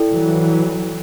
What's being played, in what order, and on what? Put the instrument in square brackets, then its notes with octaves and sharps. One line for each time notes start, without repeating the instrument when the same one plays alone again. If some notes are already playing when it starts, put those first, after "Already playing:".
Already playing: [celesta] E4 A4 D5 G5
[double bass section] E3 F#3